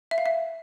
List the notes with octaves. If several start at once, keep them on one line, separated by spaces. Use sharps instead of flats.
E5
F5
E5